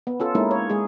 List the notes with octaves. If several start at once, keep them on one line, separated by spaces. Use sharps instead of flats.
B3
C#4 F4 A4
G#3 A#3 C#4 D#4 E4
C#5
G#3 G#4